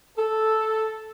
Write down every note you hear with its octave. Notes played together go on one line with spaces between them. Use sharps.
A4